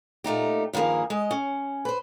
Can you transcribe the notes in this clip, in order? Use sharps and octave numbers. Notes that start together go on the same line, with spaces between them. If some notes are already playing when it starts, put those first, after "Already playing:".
A#2 A3 D#4 G4
G2 D#3 F3 A#3 G#4
G#3 D#5
C#4
B4 C5